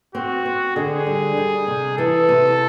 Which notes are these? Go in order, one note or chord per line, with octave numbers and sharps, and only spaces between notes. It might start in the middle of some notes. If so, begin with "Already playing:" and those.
C4 F#4
C4
D3 G#4
G3
G3
C3
E3 A4
C3